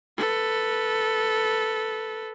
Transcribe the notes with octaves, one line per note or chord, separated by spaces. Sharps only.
A4 B4